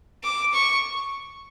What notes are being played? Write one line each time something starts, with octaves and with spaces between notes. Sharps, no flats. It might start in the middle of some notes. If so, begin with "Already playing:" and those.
D6
C#6